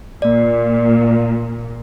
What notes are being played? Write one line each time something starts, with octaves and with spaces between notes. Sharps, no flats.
A#2 A#3 D5